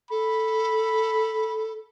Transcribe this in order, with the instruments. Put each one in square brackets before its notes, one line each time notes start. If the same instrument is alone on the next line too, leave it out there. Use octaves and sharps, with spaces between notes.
[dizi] A4 [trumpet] B5